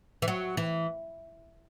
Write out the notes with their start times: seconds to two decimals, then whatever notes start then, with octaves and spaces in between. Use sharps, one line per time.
0.22 E3
0.28 F#3
0.57 E3